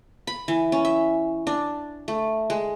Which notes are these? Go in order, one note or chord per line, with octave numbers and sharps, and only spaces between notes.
B5
E3
C#4
E5
D4
A3
G#3